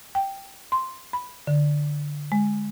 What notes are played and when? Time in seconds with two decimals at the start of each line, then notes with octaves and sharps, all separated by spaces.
0.15 G5
0.72 C6
1.13 B5
1.47 D3
2.32 G#3